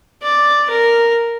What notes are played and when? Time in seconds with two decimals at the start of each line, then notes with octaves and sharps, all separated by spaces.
0.22 D5
0.70 A#4